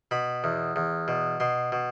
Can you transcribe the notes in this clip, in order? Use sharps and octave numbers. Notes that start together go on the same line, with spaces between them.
B2 B5
E2
E2
B2
B2 C6
B2